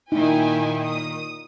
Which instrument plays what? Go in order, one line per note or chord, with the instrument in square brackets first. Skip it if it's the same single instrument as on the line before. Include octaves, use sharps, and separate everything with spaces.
[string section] A#2 D#3 [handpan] D#4 [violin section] E4 G5 G#5
[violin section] D#6